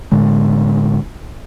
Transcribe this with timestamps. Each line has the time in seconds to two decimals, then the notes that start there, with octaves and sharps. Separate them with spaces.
0.12 A2 D3 G#3